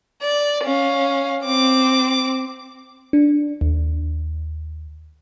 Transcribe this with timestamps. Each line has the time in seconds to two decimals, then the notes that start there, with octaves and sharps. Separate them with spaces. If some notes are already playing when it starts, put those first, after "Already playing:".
0.22 D5
0.64 C#4 F5
1.44 C4 D6
3.13 D4
3.61 D#2